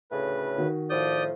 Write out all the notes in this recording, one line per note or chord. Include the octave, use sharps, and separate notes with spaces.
D2 A2 C#3 B4
D#3 F#4
A2 F3 D5 D#6 G6